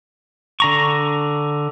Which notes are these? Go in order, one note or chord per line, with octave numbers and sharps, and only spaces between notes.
D3 A#5 C#6